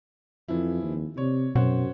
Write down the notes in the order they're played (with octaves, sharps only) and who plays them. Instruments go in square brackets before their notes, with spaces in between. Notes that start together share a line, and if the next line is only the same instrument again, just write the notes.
[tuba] F2 [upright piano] E3 F3 E4
[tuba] D#2
[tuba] C3 [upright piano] C#5 D5
[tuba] F#2 [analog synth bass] B2 [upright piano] C5 C#5 F#5